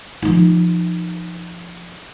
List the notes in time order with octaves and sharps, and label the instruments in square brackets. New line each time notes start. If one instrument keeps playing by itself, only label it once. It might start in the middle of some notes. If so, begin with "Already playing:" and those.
[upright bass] F3 D#4